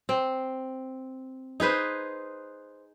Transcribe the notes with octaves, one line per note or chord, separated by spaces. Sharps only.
C4
D#4 G#4 B4 C5